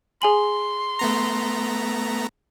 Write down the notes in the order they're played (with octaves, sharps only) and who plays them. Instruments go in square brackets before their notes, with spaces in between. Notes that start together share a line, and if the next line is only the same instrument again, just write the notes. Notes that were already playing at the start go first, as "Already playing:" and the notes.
[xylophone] G#4 G#5 F#7 [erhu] C6
[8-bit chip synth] A3 B3 A#5